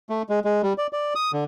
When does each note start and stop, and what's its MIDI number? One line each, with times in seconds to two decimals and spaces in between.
0.10 0.22 57
0.29 0.40 56
0.45 0.62 56
0.63 0.73 55
0.78 0.87 74
0.93 1.14 74
1.15 1.32 87
1.33 1.44 50